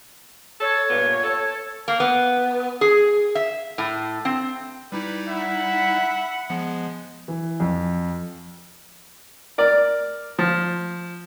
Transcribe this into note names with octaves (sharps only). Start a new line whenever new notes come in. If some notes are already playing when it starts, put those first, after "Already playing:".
A4 C#5
G2 A#2 B3
A4
A#3
B3
G#4
E5
A2
C4
G3 D#4 E4 G4 B4
E5 F#5 B5
F3 G#3 B3
E3
F2
A#4 D5
F3